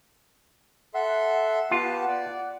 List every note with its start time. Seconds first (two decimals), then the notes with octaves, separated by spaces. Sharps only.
0.94 A4 E5 F#5 C6
1.71 B3 F4 G4 A5
2.08 D5